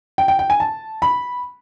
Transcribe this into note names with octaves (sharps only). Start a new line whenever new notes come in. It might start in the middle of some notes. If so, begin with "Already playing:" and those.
G5
G5
G5
G#5
A5
B5